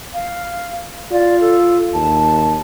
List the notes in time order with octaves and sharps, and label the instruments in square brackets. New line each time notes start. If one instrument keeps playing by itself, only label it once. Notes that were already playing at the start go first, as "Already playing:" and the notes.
[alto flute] F5
[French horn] F4 [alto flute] D5
[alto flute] A4
[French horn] D#2 [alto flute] A5